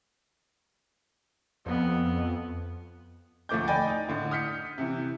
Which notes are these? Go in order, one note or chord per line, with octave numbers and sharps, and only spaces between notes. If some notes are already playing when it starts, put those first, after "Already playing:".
F2 B3
D2 F3 A3 D6 G6
D5 D#5 G5 G#5 B5 A6
D#4
A2 D3
D#6 F6 G6 B6 C#7
C3 E3